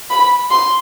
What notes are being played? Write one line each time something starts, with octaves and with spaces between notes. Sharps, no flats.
B5
C6